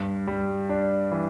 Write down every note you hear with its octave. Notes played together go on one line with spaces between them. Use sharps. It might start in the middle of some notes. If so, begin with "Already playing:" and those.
Already playing: G2
G3
D4
E3